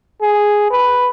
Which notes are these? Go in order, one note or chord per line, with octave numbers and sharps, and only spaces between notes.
G#4
B4